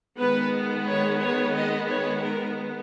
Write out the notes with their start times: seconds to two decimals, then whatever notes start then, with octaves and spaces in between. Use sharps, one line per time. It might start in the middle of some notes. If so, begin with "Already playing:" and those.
0.19 D#3 G#3 B3 B4
0.88 C#5
1.22 C#5
1.56 D#5
1.91 C#5
2.24 A#4